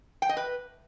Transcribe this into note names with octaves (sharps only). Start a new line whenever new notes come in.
G5
D#5
B4